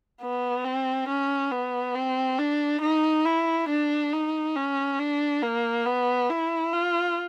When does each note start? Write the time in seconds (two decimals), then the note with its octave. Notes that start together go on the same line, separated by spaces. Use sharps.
0.22 B3
0.65 C4
1.09 C#4
1.52 B3
1.95 C4
2.39 D4
2.82 D#4
3.26 E4
3.69 D4
4.13 D#4
4.56 C#4
4.99 D4
5.43 A#3
5.86 B3
6.30 E4
6.74 F4